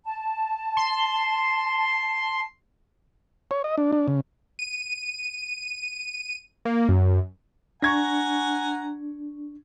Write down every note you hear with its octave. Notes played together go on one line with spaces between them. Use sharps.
A5
C6
C#5
D#5
D4
D4
C#3
D#7
A#3
F#2
D4 F#5 G#5 A#5 C#6 G#6 A#6